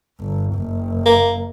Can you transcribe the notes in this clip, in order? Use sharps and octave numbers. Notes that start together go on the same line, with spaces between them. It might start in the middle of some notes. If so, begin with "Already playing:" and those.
G1
F#1
A#3